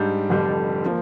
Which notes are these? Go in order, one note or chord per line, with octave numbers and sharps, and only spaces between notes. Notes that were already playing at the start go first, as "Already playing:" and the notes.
Already playing: G#2 G3 D4
F1 F2 D3 G3 D4
F3 A#3